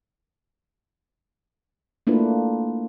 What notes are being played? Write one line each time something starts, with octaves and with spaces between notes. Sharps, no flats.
A3 A#3 D4 E4 F4 B4